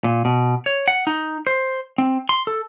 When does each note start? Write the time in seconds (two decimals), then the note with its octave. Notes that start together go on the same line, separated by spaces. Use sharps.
0.04 A#2
0.25 B2
0.66 C#5
0.88 F#5
1.07 D#4
1.47 C5
1.98 C4
2.29 C6
2.47 A4